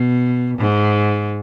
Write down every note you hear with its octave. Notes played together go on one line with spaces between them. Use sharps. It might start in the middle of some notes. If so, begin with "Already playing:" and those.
Already playing: B2
G#2